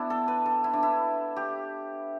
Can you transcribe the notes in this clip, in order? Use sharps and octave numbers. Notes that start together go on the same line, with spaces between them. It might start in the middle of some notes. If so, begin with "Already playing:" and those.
Already playing: B3 D4 E4
A4
B4
A4
E4
D4
E4
G4